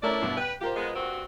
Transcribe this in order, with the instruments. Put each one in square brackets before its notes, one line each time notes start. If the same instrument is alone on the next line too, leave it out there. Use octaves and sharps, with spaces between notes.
[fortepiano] A3 C#4 A#4 [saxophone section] D4 E4 D5
[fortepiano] G2 B2
[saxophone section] B4 [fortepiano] G5
[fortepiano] F4 A#4 C5 [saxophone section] G4
[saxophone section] G#3 B3
G2 C4 F#4